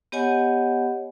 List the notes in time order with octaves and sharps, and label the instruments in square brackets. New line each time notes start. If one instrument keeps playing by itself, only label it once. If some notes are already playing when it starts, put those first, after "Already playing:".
[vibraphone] B3 G4 C#5 D#5 F#5 G#5